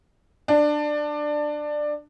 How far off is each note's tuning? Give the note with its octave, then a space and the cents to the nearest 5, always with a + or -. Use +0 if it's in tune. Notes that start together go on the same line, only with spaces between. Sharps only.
D4 +15